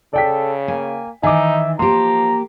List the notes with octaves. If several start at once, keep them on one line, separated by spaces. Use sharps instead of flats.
C#3 A4 D5 G5 B6
A#3 G#5
D#3 E3 D#4 E5 G#5 D6
F3 A#3 G4 A#5 C6